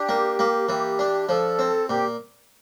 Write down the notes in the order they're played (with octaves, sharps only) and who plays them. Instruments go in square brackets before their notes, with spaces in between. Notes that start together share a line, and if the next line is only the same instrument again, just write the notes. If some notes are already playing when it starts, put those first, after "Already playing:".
Already playing: [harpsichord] D4 [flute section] G4
[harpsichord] A#3
A#3
[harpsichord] E3 [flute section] G4
[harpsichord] D4
[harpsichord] F3 [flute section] A4
[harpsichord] C4
[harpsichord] A#2 [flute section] G4